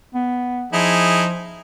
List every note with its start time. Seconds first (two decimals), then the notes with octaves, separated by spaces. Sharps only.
0.15 B3
0.73 F3 D#4 E4 G#4